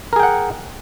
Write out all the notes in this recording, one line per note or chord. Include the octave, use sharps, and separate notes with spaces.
G#4 A#4 F#5 G5